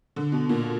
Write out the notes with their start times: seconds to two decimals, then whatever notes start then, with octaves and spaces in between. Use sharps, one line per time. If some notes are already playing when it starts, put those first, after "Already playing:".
0.16 D3
0.32 B2
0.49 A#2